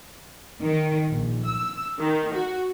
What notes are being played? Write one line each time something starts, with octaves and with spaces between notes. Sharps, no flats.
D#3
A#1
E6
D#3
F#4